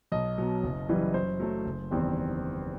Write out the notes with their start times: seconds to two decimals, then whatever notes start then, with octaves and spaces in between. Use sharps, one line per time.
0.12 B1 D#5
0.38 B2 F#3
0.63 F#1
0.89 F#2 E3 G3
1.14 F#2 C5
1.40 F#3 A3
1.65 F#1
1.91 E2 D#3 G3 C4